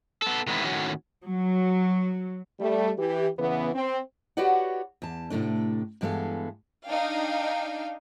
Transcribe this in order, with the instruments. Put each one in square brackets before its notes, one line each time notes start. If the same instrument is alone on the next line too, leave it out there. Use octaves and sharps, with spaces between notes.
[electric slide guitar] B3 A4
D#3 G#3 B3 C4 E4
A2 D#3 C#4 F#4
[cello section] F#3
[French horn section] G3 A3
E3 G4
E2 C#3 E3 B3
C4
[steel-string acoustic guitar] F#4 G4 B4 C#5 D5 F#5
E2 A5
A2 C3 A3 D4
G2 E3 G#3 B3 A4 F5
[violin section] D4 D#4 F5 G5